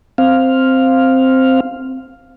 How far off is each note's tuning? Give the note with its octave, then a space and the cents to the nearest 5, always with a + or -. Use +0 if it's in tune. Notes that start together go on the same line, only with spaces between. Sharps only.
C4 +0 F5 +0